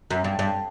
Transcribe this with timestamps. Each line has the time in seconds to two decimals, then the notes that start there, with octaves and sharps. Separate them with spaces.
0.11 F#2
0.24 G2
0.39 G2